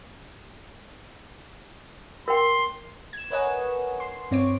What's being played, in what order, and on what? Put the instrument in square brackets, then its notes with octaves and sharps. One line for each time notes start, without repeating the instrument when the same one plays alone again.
[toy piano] A#4 G5 [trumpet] C6
[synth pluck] G#6 E7
A#4 B4 C#5 D#5 F#5 G#5
C6
G2 C4 C#5 D6 D7